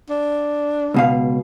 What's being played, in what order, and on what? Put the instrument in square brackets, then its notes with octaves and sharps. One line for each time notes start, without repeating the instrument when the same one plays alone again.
[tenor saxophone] D4
[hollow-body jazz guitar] C#2 B2 F5